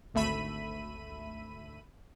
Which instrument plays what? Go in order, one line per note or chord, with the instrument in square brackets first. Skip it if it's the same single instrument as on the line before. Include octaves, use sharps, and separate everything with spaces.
[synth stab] G#1 D2 A3 E5 B5 D#7